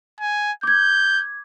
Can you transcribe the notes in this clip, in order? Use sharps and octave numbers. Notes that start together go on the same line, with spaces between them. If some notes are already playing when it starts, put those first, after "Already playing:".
G#5
D6 G6 G#6